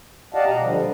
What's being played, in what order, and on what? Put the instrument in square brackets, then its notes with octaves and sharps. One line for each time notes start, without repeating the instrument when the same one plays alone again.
[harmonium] G4 D5 D#5 F5 F#5 A5
B2 D#5 A#5
A#2 D3 F3 G3
D4